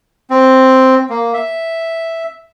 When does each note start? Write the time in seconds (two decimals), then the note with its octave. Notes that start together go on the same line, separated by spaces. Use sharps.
0.30 C4
1.10 A#3
1.34 E5